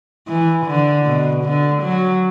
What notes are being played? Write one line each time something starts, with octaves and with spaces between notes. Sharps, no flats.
E3
D3
B2
D3
F#3